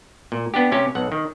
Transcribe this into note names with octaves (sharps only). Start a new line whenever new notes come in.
A#2
B3 D4 G4
C3 C#4 G4
B1 F#5
D#3